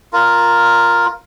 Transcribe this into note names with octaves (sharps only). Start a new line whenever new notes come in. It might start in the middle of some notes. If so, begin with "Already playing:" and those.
F4 A#4